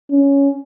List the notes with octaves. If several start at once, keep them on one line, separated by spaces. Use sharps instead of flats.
C#4